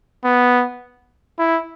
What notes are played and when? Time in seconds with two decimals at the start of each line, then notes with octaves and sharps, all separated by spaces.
0.24 B3
1.39 E4